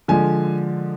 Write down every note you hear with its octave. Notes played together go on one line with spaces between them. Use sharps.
D3 F3 G#3 G#5